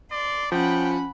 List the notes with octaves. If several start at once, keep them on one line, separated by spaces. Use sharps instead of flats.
D5 C6
F3 C#4 F#5 G5 B5